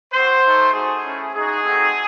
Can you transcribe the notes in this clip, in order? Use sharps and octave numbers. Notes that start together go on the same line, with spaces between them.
C4 F#4 C5
A3 D#4 F#4
A3 D#4 F#4 G#4
A3 C#4 E4
G#3 D#4 F#4 G#4
A3 C4 D#4 F#4